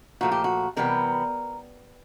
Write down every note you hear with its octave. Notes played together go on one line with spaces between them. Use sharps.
A#2 F3 A3 F#4
G4
F#4
C3 E3 G3 B3 A#4